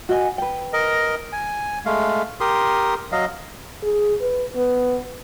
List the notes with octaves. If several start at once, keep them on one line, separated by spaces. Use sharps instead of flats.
F#4 D#5 G#5
B4 G5
A#4 D#5
G#5
G#3 A3 F5
G4 A#4 C6 D#6
F#3 D#5 F5
G#4
B4
B3